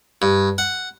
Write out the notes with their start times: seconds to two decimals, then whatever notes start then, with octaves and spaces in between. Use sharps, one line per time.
0.22 G2
0.58 F#5